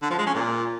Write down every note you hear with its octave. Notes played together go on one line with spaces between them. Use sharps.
D3
F3
G#3
C#4
A#2